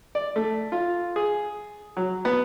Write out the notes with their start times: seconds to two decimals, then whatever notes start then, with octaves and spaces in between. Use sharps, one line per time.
0.15 D5
0.36 A3
0.72 F4
1.16 G#4
1.97 F#3
2.25 B3